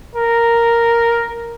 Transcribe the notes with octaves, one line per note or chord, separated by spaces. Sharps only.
A#4